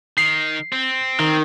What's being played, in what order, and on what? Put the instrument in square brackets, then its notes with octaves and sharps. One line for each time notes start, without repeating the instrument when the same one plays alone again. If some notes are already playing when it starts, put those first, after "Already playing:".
[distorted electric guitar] D#3 [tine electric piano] C7
[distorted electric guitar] C4
[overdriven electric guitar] D#3